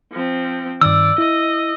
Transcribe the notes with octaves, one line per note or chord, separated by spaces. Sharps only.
F3 C4
G2 D#3 D5 E6
E4 D#5